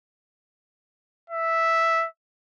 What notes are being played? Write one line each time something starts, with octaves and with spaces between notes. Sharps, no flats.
E5